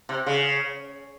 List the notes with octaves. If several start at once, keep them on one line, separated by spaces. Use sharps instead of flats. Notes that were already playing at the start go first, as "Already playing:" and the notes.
C3
C#3